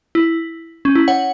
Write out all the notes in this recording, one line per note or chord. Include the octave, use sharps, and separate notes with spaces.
E4
C#4
E4
C#5 F#5